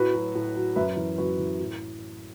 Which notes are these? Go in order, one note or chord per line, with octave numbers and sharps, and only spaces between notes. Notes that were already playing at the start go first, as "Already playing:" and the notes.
Already playing: A2 F#4 B4
F#3
A2
F#3
F#2 B4 E5
E3
F#2 F#4 B4
E3
A2